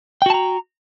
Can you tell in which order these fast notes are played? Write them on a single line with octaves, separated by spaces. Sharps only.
G5 F#4 A5 A#5